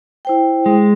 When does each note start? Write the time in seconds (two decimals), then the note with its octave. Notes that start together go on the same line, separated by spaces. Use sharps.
0.25 E4 C5 G5
0.66 G#3